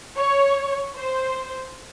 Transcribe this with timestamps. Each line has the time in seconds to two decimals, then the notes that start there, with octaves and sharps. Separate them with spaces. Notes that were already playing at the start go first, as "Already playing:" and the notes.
0.16 C#5
0.95 C5